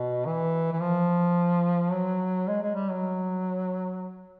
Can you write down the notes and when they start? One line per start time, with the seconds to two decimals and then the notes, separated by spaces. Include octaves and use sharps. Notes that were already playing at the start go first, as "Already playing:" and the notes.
Already playing: B2
0.26 E3
0.72 E3
0.81 F3
1.92 F#3
2.48 G#3
2.62 G#3
2.75 G3
2.90 F#3